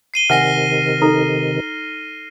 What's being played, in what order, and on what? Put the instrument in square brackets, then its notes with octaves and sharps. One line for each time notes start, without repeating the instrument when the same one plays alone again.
[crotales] C7 D#7 G7
[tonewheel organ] C3 D#3 [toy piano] E5 F#5 G#5 [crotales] F6 A#6 C7
[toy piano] D#4 A4 A#5